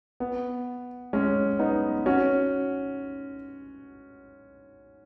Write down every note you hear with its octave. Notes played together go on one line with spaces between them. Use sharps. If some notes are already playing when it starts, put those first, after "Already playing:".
B3
G#3 C#4
B3 D#4
C#4 F#4